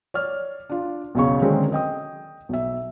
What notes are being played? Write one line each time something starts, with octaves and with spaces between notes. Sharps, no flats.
C#5 D5 F6
D4 F4
B1 E2 C#3 C#5 C#6
D3 D#3 F#3 G#3 C4 C#4
D#5 G5 D#6
B1 E5